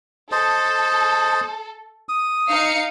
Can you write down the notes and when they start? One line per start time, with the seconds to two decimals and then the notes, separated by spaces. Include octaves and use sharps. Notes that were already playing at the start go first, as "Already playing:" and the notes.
0.32 A4 C5 D#5 A5
2.09 D#6
2.49 D#4 F5 C#7